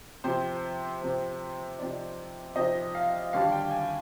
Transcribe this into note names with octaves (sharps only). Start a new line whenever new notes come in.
C3 F3 C4 C5
C3 F3 C4
C3 F3 C4 D#4 D5
C3 F3 C4 D#4 D#5
F5
D#2 D3 G3 D4 F5
G5
G#5